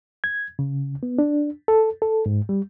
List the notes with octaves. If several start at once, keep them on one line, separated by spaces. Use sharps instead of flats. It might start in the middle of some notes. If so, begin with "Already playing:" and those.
G#6
C#3
B3
D4
A4
A4
G#2
G3